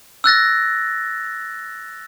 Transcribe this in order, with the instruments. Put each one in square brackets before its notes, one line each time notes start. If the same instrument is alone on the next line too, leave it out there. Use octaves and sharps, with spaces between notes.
[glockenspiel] E6 F#6 A6 A#6